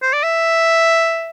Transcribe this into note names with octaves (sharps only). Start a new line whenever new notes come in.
C5
D5
E5